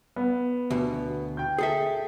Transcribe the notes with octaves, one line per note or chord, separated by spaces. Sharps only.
B3
D2 B2
G5 G6
G#4 A4 E5